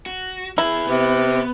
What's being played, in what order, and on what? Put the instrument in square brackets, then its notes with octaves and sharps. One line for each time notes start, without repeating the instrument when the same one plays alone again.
[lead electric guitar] F#4
[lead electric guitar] E3 G#4 [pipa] E4
[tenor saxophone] C3 [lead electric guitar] B3